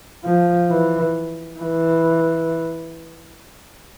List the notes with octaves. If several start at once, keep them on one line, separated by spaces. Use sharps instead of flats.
F3
E3
E3